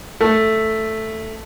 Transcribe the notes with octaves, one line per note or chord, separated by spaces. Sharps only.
A3